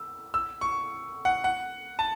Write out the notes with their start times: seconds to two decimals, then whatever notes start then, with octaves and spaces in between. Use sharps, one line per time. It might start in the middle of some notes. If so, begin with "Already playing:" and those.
Already playing: E6
0.34 E6
0.61 C#6
1.25 F#5
1.44 F#5
1.99 A5